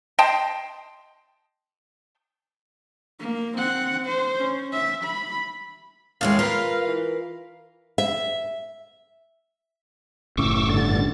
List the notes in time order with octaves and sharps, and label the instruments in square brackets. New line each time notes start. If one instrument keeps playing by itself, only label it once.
[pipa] D#5 G5 A5 C6
[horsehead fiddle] A#3
C4 F#5
C5
C#4
E5
B5
[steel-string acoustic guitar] D#2 A2 G#3 [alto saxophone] F5
[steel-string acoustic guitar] F4 A#4 B4
[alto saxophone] E3
[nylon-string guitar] E5
[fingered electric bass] F#1 A2 C#4 [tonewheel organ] C#6 D6 E6
[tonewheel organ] G2 D3 A6